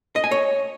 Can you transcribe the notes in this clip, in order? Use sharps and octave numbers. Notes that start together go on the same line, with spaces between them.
D#5
G#5
C#5